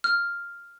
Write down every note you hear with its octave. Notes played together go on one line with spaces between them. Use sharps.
F6